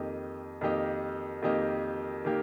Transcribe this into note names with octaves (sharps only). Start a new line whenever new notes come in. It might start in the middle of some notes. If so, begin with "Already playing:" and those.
Already playing: F2 D#3 A#3 G4 D#5
F2 D#3 A#3 G4 D#5
F2 D#3 A#3 G4 D#5
D#3 A#3 G4